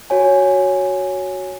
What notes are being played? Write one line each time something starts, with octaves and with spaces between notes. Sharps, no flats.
F#4 C#5 G#5